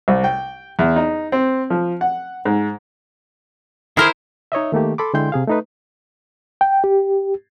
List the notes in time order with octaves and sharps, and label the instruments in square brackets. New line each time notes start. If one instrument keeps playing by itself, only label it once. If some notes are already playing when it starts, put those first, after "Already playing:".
[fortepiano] C2
G5
E2
D#4
C4
F3
F#5
G#2
[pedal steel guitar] D#3 G#4 F6 [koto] E4 A#4 C5
[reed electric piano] D#4 C#5 D#5 E5
D#3 A3 A#3 G4
A4 B5 C6 D6
D3 G#3 E4 G5 C6 G6
C3 G#4 F5
A3 D#4 B4
G5
G4